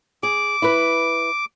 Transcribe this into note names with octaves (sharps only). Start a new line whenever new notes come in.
G#4 D6
E4 B4